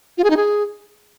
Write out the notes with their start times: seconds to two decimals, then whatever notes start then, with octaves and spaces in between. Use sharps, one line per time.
0.18 F4
0.24 G#4
0.30 D#4
0.37 G#4